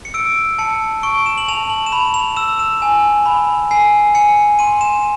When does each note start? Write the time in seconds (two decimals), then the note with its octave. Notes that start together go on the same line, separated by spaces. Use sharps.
0.05 C#7
0.14 E6 D7
0.58 A5 C#7
1.03 C#6 D7
1.26 E7
1.38 F#7
1.48 A5 F7
1.70 F#7
1.86 E7
1.92 B5 F7
2.14 F7
2.36 E6 E7
2.59 E7
2.82 G#5
3.26 B5
3.71 G#5 C7
4.15 G#5 C#7
4.59 C6 D#7
4.81 E7